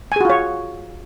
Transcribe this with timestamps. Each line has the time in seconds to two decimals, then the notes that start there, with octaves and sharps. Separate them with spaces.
0.12 G#5
0.16 G#4
0.21 F#4
0.25 F4
0.30 C#5